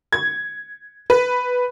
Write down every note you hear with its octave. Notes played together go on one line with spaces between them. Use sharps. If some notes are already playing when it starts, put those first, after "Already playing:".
G#6
B4